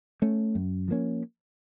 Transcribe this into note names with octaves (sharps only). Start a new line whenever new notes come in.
A3 C#4
F#2
F3 A#3 C#4